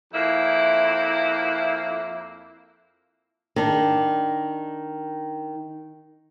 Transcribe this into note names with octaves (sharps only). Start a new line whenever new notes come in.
F2 A#3 E4
D#3 D4